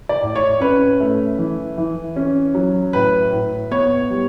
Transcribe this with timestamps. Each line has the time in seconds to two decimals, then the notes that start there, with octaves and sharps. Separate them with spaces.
0.09 D5
0.22 A2
0.36 C#5
0.60 C#4 B4
1.00 A3
1.38 E3
1.78 E3
2.16 C#4
2.55 F#3
2.93 A2 B4
3.32 A2
3.71 B3 C#5
4.10 G3